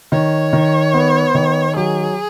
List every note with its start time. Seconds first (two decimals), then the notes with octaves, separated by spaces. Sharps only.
0.12 D#3 C#5
0.53 D#3
0.94 B3
1.35 D#3
1.76 F#3 G#4